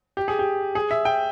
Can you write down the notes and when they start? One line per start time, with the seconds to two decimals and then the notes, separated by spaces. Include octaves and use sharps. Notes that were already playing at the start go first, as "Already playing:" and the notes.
0.17 G4
0.28 G#4
0.39 G4
0.75 G#4
0.91 E5
1.05 G5